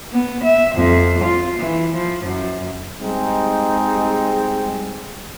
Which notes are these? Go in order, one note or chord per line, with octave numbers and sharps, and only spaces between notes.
B3
E5
F2
F4
E3
F3
F#2
G3 G#3 C4 D#4